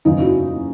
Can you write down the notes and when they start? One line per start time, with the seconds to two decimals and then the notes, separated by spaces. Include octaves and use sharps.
0.05 F#1 E2 C#3 D#4 F4
0.19 E4 F#4